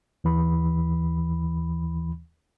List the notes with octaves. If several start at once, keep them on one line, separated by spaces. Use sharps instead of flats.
D#2 E3 B5